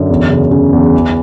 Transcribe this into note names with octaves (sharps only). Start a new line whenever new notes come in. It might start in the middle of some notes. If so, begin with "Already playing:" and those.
Already playing: F#2 D3
E2
C#3
C#3
E2
E3